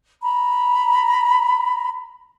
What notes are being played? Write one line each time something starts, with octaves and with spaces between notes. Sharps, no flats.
A#5 B5